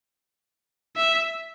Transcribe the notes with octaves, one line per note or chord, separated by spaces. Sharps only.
E5